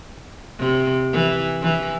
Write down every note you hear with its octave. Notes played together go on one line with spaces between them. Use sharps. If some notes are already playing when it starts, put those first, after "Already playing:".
C3
E3
E3